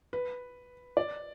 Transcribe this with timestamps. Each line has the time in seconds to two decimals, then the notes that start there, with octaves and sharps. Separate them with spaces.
0.13 B4
0.97 D5